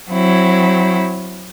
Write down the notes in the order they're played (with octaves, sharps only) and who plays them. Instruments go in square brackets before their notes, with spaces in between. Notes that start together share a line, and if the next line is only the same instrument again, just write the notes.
[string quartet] F#3 C4 E4